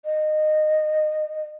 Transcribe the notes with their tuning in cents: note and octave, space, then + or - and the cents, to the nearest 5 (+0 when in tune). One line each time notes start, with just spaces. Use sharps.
D#5 -20